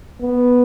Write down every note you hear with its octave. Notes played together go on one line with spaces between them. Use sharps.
B3